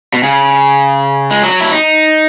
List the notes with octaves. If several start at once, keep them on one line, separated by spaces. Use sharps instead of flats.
B2
C#3
G#3
F#3
E4
D#4